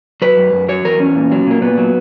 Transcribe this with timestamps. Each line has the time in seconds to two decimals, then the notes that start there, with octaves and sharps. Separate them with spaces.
0.22 F#3 B4
0.37 F#2
0.52 F#2
0.68 F#3 C#5
0.84 E2 A#4
1.00 E2 C#4
1.15 A#2
1.32 F#3
1.46 A#2 A#3
1.62 A#2 B3
1.78 F#3